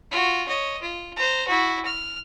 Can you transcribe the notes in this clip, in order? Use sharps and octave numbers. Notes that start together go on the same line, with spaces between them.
F4 F#4
C#5 D#5
F4
C5 A#5
E4 F#4
F6